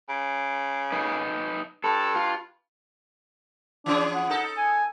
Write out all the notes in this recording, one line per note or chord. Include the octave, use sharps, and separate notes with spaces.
C#3
D#4 B4
G2 A4
F4
E3 C#4 D4 G#4
F#5
D#4 A4
G#5